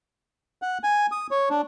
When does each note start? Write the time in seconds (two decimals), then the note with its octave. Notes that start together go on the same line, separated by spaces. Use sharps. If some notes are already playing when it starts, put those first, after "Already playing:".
0.62 F#5
0.84 G#5
1.12 D#6
1.31 C#5
1.50 D4